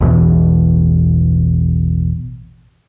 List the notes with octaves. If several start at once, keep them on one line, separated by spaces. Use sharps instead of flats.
A1 E2 B2 E3